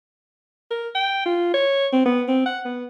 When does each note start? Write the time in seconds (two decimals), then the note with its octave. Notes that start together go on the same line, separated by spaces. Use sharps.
0.71 A#4
0.95 G5
1.26 F4
1.54 C#5
1.93 C4
2.06 B3
2.28 C4
2.46 F#5
2.65 B3